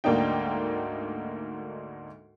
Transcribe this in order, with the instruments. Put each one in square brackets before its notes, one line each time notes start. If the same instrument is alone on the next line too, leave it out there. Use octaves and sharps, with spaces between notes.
[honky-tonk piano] D2 G#2 A#3 D4 D#4 G5